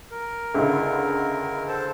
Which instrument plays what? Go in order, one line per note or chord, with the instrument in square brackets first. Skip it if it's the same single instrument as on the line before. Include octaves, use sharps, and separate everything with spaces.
[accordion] A#4
[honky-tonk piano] C#2 D3 E4
[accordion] A4 C5 A5